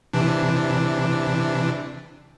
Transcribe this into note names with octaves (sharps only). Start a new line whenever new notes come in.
C3 E3 D4